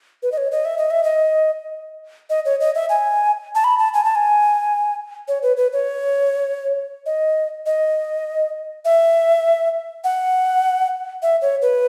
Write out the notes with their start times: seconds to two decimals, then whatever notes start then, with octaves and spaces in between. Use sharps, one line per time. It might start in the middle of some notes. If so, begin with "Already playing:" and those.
0.23 B4
0.32 D#5
0.37 C#5
0.52 D#5
0.65 E5
0.78 D#5
0.91 E5
1.04 D#5
2.30 D#5
2.45 C#5
2.60 D#5
2.75 E5
2.89 G#5
3.55 A5
3.64 B5
3.79 A5
3.94 G#5
4.05 A5
4.15 G#5
5.28 C#5
5.43 B4
5.57 B4
5.73 C#5
7.06 D#5
7.66 D#5
8.85 E5
10.04 F#5
11.22 E5
11.42 C#5
11.62 B4